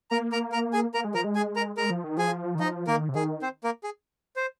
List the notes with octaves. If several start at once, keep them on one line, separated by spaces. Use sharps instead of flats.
A#3 A#4 A#5
A#4 A#5
A#4 A#5
G#4 G#5
A#3 A#4 A#5
G#3
F3 A#4 A#5
G#3
G#4 G#5
A#4 A#5
G#3 A#4 A#5
F3
D#3
F3 G#4 G#5
D#3
F3 D#4 D#5
D#3 A#3 A#4
C3
D#3 G#4
C4 C5
A#3 A#4
G#4
C5